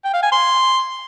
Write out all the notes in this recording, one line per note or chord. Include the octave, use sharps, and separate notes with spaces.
G5
F5
G#5
C6